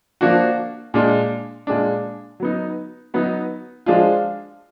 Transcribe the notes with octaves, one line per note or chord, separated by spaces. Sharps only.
F3 A#3 D4 F#4
A#2 G#3 D4
A#2 G#3 D4
F#3 B3 D#4
F#3 B3 D#4
F3 G#3 D4 F4